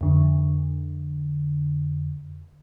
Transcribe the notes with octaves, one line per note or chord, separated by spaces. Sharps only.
F2 D3